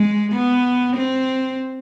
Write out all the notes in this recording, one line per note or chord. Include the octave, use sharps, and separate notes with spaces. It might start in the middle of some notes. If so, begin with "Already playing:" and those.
Already playing: G#3
B3
C4